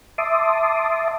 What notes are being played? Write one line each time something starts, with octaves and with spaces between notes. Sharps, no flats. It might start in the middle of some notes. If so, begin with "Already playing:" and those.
E5 A5 C6 D6 D#6